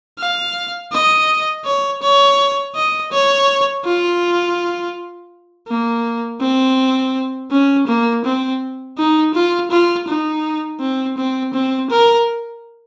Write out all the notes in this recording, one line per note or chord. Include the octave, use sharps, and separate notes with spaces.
F5
D#5
C#5
C#5
D#5
C#5
F4
A#3
C4
C#4
A#3
C4
D#4
F4
F4
D#4
C4
C4
C4
A#4